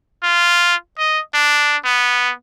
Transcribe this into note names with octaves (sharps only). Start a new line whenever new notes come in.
F4
D#5
D4
B3